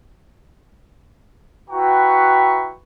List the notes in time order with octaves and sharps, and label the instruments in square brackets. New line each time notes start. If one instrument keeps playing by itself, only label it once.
[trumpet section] E4 F#4 B4 G5 A#5 C#6